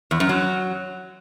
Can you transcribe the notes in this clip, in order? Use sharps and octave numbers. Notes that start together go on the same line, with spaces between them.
E2
F#2
F#3